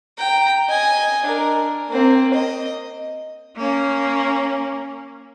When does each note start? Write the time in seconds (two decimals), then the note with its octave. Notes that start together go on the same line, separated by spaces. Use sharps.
0.18 G5 A#5
0.69 D#5 G#5
1.25 D4 A#4
1.89 A#3 C4
2.34 D#5
3.56 A#3 C#4